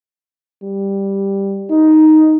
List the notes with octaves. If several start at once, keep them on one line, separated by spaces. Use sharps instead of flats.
G3
D#4